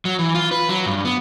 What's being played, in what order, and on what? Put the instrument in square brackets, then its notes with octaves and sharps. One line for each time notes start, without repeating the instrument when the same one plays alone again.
[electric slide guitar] F#3
E3
F4
B4
F#3
G2
B3